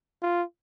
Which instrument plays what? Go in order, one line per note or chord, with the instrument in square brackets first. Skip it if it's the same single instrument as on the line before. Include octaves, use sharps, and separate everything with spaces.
[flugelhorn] F4